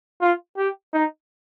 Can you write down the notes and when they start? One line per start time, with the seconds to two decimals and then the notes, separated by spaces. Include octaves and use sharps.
0.21 F4
0.57 G4
0.93 D#4